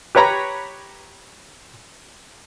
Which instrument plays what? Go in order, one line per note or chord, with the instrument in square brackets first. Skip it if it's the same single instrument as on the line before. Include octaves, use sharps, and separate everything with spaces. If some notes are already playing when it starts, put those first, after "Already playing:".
[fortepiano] G4 B4 C#5 A#5 B5